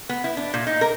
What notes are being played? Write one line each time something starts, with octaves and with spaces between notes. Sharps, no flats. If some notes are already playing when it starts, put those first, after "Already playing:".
B3
E4
D4
A#2
D#4
A#4